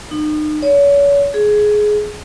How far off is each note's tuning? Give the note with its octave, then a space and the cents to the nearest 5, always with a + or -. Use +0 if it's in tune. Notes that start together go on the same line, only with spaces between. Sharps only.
D#4 -35
C#5 +35
G#4 +15